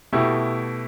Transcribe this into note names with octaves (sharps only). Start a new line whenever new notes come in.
B2 A3 E4 G4